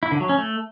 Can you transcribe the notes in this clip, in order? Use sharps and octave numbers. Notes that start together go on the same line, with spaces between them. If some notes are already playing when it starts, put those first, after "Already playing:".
E4
D3
F#3
C#4
A3